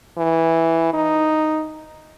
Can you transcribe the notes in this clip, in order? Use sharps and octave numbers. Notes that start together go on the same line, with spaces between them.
E3
D#4